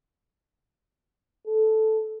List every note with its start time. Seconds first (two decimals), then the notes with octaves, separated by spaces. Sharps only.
1.47 A4